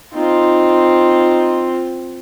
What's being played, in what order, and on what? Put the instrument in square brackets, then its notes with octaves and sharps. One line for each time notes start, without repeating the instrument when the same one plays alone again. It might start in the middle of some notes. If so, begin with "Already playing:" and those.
[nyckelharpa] C4 F4 [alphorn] D#4